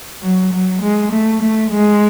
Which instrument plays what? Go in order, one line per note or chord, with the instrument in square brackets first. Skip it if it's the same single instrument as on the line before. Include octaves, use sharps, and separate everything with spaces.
[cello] F#3
F#3
G#3
A3
A3
G#3